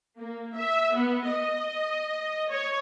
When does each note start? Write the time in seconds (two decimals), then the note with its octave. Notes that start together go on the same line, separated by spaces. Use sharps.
0.18 A#3
0.56 E5
0.93 B3
1.27 D#5
2.50 C#5